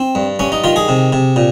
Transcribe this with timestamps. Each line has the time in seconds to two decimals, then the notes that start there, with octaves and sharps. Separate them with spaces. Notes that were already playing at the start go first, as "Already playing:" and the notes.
Already playing: C4
0.15 G2
0.39 G2 C#4
0.52 D#4
0.64 D#3 F4
0.76 G#4
0.88 C3
1.13 C3
1.36 A#2